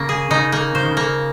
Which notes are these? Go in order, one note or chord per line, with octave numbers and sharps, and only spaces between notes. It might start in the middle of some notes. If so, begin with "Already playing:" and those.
Already playing: C#3 A#3
G#4
C#3 D#4
A#3
C#3 C5
D#3
C#3
A#3